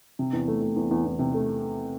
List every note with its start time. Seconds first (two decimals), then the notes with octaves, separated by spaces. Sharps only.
0.19 C3
0.33 E2
0.48 A3
0.61 A3
0.76 E2
0.91 E2
1.05 E2
1.19 C3
1.34 A3